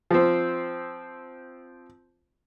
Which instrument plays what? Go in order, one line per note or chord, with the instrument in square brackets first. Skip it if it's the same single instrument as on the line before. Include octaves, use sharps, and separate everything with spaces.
[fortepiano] F3 C4